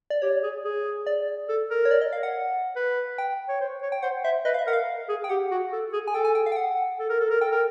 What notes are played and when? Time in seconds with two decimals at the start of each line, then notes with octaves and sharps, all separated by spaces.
0.10 D5
0.22 G4 C#5
0.43 G#4
0.64 G#4
1.06 D5
1.49 A4
1.70 A#4
1.85 C#5
1.91 D5
2.01 D#5
2.13 F5
2.23 F#5
2.76 B4
3.18 G5
3.49 C#5
3.61 C5
3.82 C#5
3.92 G5
4.02 C5 F#5
4.24 C5 E5
4.45 B4 D#5
4.54 F5
4.59 E5
4.67 A#4 F#5
4.73 F5
5.09 G#4
5.24 G5
5.29 G4 F#5
5.51 F#4
5.72 A4
5.93 G#4
6.07 G#5
6.14 A4 G5
6.25 G#5
6.35 G5
6.46 F5
6.52 G5
6.56 F#5
6.99 A4
7.09 A#4
7.20 A4
7.30 A#4
7.41 A4 G5
7.52 A#4